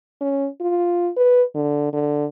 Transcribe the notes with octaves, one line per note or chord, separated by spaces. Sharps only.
C#4
F4
B4
D3
D3